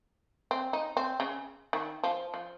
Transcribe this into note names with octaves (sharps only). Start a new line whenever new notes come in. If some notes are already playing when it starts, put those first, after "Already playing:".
C4
D#4
C4
C#3
D#3
F3
F3